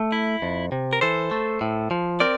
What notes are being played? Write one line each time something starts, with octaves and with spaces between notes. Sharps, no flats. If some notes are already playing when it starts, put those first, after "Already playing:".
Already playing: A3
E4
F2
C3
A#4
E3 A4 C5
A3
A2
F3
C4 A#4 D5